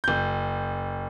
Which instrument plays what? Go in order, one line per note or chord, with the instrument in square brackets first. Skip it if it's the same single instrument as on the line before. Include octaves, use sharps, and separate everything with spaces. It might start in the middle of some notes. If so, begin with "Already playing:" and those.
[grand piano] F#1 G6